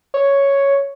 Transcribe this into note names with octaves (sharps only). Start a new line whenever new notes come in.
C#5